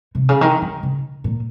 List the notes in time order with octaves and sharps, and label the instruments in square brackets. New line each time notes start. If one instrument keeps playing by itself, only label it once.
[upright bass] C3
C#3
D#3
D#3
C#3
A#2